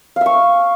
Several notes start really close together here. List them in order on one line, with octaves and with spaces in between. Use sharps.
F5 E5 C#6